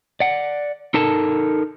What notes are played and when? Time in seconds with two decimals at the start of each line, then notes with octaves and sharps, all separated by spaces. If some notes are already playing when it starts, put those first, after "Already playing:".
0.20 D5 F#5
0.94 D#4 A4 A#4 A5